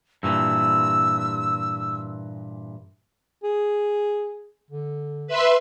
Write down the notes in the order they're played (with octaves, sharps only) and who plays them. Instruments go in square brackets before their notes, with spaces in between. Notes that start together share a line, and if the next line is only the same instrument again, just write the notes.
[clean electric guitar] G2 A#2 E3 [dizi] E6
[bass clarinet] G#4
D3
[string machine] B4 E5 C6